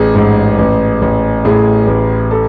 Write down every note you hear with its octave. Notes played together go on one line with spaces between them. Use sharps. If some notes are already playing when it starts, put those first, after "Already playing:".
Already playing: A1 G#4
G#2
A1
A1
A2 G#4
A1
A4